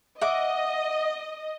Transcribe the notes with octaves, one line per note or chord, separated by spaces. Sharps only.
D#5 E5 F#5 D6